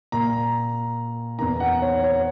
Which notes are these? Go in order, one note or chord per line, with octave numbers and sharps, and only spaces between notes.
A#2 A#5
E2 D#3 A#5
F#5
C#5
C#5